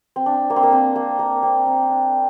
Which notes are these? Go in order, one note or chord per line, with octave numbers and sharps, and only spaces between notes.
C4
D4
A#3
C4
A#3
C4
A#3
A#3
C4
C4
D4